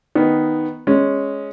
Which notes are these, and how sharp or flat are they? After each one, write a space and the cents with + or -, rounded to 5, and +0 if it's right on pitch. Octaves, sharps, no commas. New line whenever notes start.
D#3 +0 B3 +0
G#3 +0 C#4 +0